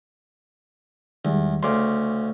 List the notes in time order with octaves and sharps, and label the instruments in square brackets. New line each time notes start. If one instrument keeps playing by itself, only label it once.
[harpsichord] E2 [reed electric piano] D#3 G3 G#3
[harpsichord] D2 C#3 [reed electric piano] C6 D6